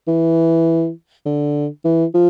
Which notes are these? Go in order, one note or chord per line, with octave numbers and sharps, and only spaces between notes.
E3
D3
E3
F3